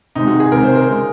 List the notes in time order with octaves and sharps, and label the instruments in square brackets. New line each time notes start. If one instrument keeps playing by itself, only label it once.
[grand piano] C3 D#3 G#3 [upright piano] D#4
[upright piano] F#4
G#4
[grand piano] C3 D#3 G#3 [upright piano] A#4
[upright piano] C5
A#4
[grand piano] C#3 G#3